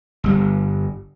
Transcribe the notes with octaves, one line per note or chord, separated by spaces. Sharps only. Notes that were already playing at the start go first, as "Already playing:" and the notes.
G1 G3